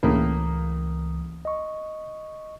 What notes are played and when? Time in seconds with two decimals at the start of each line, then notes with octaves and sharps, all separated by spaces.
0.03 C#2 A2 C#3 E3 A#3 D#6
1.45 D#5 C#6